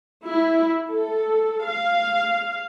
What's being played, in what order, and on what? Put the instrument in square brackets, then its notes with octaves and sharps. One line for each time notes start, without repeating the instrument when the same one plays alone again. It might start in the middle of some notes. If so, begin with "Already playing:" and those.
[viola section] E4
A4
F5